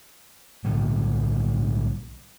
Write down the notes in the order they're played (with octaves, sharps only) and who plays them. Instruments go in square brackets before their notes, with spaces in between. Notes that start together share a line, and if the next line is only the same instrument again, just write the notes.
[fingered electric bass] B1 A2 D3 G3